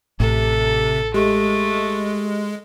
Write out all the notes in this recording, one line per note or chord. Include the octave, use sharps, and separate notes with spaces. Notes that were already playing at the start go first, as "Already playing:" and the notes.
A1 A2 C3 A4
G#3 A3 G4